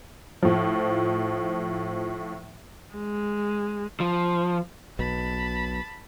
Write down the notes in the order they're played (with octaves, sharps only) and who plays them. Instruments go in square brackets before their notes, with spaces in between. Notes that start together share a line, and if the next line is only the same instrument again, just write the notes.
[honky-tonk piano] A2 F3
[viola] G#3
[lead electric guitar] F3
[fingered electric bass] B1 B2 [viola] A5 B5